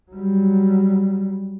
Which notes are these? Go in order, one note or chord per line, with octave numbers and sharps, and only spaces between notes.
F#3 G3